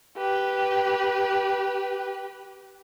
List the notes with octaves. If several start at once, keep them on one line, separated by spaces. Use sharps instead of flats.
G4 B4